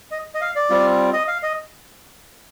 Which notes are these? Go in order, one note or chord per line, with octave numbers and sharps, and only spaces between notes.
D#5
D#5
F5
D5
G3 C4 F4
D#5
F5
D#5